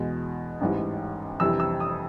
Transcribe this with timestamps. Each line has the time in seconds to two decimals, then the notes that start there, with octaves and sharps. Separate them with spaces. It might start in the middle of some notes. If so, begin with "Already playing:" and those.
Already playing: E2 B2 G#3
0.61 A1 G#2 E3 G3
1.40 F2 C3 E3 G3 E6
1.60 E6
1.80 D#6